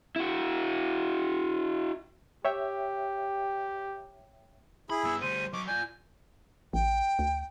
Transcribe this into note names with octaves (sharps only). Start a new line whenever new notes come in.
E4 F#4
G4 C#5 E5 G5
E4 G#4 B5
G2 B3 E6
D2 G3 C5 D#7
F#3 D#5 C#6 D6
F4 D5 G#5 G6
A1 G5
D2